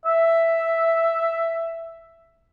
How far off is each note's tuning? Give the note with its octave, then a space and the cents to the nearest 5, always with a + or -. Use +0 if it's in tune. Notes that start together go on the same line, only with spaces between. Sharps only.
E5 +5